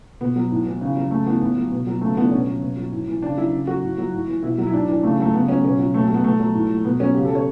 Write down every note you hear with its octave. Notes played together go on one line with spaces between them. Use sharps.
B2 B3
F#3
A2
E3
C#3
F#3
C#3 A3
E3 B3
A2 B3
F#3
B2
F#3
C#3 A3
E3 B3
D4
B2 C#4
F#3
B2
F#3
A2
E3
C#3 D4
F#3 E4
C#3
F#3 F#4
A2
F#3
A2
E3
B2 E4
F#3
E4
A2 D4
E3 D4
C#3 A3
F#3 A3
C#3 B3
F#3 C#4
B2 C#4
F#3
B2 A3
A3
F#3
B3
B2 A3
F#3
A2
F#3
B2 B3
F#3 C#4
C#3 G4
A4
F#3
C#5